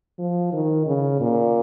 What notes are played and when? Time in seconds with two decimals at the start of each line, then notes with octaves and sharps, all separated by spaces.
0.18 F3
0.53 D#3
0.87 C#3
1.21 A#2